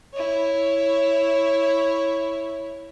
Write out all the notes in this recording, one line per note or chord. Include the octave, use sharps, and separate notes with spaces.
E4 C#5